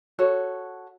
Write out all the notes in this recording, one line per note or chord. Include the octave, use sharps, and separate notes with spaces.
F#4 A4 C#5